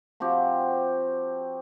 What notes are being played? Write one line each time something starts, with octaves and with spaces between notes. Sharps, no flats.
F3 C4 F#4 G4